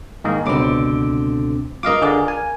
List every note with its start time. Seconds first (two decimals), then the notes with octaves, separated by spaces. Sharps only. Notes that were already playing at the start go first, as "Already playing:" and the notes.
0.24 G#2 D#3 A#3
0.46 C#2 B2 D3 C4 D6
1.83 F4 A#4 D#5 F5 D6
2.02 D3 G#4 D5
2.28 G#5